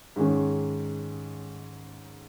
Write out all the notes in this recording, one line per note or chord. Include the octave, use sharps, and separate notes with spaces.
G#2 D#3 G#3 C#4